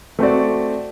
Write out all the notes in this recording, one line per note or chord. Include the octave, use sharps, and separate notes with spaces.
A3 C4 F#4 D5